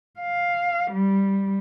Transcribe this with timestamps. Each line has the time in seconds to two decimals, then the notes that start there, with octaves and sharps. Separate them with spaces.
0.20 F5
0.92 G3